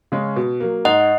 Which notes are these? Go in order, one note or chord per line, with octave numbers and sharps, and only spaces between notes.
C#3 G#3 C#4
B2
F#3 A#3
G#2 D#5 F#5